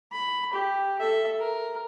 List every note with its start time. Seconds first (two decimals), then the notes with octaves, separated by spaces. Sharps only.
0.12 B5
0.53 G4
0.99 A4 E5
1.39 A#4